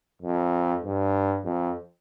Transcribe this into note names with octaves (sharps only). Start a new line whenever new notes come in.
F2
G2
F2